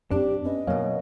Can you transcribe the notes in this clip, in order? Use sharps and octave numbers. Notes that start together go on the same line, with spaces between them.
F#2 B3 C4 D4 G4
B3 C#4 B4 D#5
F#2 B2 A#3 A#4 C#5 F5